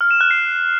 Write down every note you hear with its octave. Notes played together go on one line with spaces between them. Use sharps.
F6
E7
F#6
C7